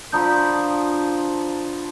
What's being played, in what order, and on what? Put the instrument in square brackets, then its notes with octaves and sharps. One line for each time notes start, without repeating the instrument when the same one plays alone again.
[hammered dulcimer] D3 F3 B5 [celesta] A#5 D#6 G6